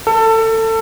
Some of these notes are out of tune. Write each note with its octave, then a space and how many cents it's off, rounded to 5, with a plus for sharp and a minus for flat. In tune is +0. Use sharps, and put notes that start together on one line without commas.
A4 +25